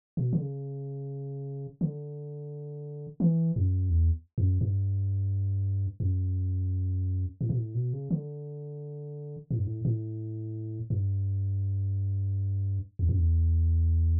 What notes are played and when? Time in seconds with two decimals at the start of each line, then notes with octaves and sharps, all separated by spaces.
0.17 B2
0.33 D3
0.41 C#3
1.81 D3
3.20 E3
3.56 F#2
3.90 E2
4.38 F#2
4.61 G2
6.00 F#2
7.41 A2
7.49 B2
7.58 A2
7.75 B2
7.93 C#3
8.11 D3
9.51 A2
9.59 G2
9.67 A2
9.85 A2
10.90 G2
12.99 E2
13.09 F#2
13.18 E2